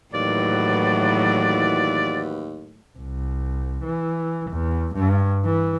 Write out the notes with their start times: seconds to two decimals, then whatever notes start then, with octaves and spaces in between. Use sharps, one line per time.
0.14 D#2 A2 E3 F#3 F#4 B4 D5
2.98 C2
3.84 E3
4.51 E2
4.95 G2
5.45 E3